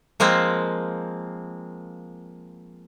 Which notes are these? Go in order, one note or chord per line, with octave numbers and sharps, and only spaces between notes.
F3 G#3 A#3 C4